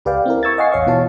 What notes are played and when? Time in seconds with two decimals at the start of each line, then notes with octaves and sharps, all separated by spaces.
0.05 C#2 G4 B4 D5 F5 G5
0.26 C4 E4 A#4
0.43 C#6 E6 G#6 A6
0.58 D#5 F5 F#5 G#5 C#6 C7
0.72 A1 E2 C#5 F5 C#6
0.87 B2 E3 F4 C#5 A5